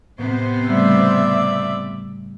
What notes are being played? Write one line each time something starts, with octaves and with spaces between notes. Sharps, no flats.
A2 C3 B3 C5
C#3 G3 A3 D5 E5